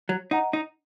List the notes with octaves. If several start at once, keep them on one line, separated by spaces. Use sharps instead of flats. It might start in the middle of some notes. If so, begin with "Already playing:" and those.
F#3
D#4 D#5 F#5 A#5
D#4